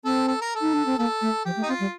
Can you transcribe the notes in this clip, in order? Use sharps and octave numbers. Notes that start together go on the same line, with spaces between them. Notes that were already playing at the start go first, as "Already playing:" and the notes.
C4 A4
A4
A#4
A4
D#4
D4
C4
A#3 A4
A3
F3 G4
A3
D#4
C4 F4
G3